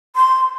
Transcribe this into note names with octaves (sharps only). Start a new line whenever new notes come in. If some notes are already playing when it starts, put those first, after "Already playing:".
C6